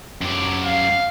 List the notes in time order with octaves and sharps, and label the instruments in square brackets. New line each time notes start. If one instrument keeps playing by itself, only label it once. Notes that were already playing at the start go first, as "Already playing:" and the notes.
[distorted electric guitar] F#2 G4
[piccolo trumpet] F5